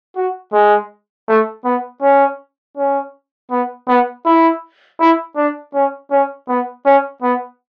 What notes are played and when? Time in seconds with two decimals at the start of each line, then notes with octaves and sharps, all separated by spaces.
0.16 F#4
0.53 G#3
1.28 A3
1.64 B3
2.02 C#4
2.77 C#4
3.51 B3
3.88 B3
4.26 E4
5.00 E4
5.36 D4
5.74 C#4
6.11 C#4
6.48 B3
6.86 C#4
7.22 B3